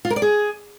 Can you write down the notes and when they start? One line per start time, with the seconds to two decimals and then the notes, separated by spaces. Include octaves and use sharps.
0.05 F4
0.10 A#4
0.16 D5
0.22 G#4